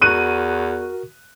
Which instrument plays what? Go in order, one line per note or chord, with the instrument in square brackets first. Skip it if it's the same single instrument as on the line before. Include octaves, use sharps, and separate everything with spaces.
[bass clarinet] E2 [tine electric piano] F#4 A#4 C#6 [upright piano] F#6 D#7